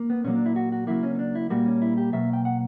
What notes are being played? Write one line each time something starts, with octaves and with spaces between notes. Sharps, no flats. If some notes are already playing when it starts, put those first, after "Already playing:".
Already playing: A#3
B3
A#2 F#3 A#3 C#4
D4
E4
F#4
F#4
C#3 F#3 A#3 E4
C#4
C#4
D4
E4
A#2 G3 A#3 F#4
C#4
E4
G4
B2 F#3 A#3 E5
G5
F#5